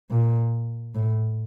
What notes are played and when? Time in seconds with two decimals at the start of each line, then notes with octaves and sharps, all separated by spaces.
0.10 A#2
0.95 A2